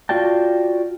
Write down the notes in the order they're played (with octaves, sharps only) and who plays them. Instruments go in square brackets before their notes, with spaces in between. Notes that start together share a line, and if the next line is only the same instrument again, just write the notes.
[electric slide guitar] F4 F#4 D5 G5 A5